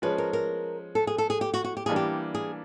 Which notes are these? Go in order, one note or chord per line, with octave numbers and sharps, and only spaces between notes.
F3 G#3 C#4 B4
A#4
A#4
A4
G#4
A4
G#4
G4
F#4
F#4
G4
E3 G3 A#3 D4 G#4
G4
G#4